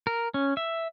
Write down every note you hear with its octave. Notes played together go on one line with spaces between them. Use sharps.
A#4
C#4
E5